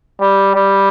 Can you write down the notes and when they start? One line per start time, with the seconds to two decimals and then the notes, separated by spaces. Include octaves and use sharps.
0.21 G3
0.55 G3